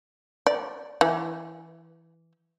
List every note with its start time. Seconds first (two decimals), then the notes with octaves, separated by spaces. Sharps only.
0.47 D5
1.01 E3